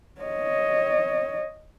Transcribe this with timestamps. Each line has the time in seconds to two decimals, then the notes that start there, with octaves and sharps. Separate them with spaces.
0.22 C#5 D#5